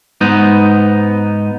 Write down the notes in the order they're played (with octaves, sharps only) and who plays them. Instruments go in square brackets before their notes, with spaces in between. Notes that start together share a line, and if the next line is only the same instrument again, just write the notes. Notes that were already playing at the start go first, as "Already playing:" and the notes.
[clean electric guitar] G#2 B3 D#4